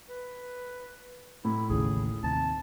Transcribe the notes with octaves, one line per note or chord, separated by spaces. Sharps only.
B4
A2 E4
A1 D#2 C#3 G#4
D#2 C3 A5